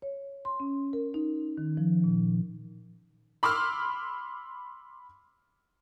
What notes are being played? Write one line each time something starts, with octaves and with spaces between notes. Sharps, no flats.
C#5
C6
C#4
A#4
D#4
D#3
F3
A#2
B5 C6 D6 E6 F6